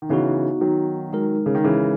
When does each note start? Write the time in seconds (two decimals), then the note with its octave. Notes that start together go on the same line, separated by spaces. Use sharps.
0.02 D#3
0.09 C#3 E3 B3 D#4 F#4
0.61 D#3 F#3
1.13 G#3 D#4 A#4
1.46 C#3
1.55 D#3
1.64 C#3 E3